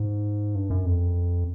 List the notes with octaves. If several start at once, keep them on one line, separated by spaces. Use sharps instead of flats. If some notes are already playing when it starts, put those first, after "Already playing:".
Already playing: G#2
G2
F#2
F2